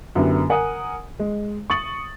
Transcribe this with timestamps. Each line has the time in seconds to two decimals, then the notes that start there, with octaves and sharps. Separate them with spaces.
0.15 F#2 D3 B3 E4 G4
0.50 A#4 F#5 G#5 D#6
1.19 G#3
1.70 C#6 D#6 A6 F#7